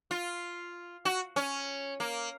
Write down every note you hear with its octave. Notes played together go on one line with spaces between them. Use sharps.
F4
F#4
C#4
A#3